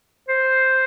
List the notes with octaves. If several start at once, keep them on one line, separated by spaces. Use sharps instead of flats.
C5